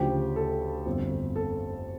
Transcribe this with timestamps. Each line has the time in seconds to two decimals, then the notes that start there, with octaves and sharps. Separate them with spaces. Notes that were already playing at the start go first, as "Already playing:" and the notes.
Already playing: D2 C#3 F3 G4
0.36 A4
0.86 G1 F2 D3
1.36 A4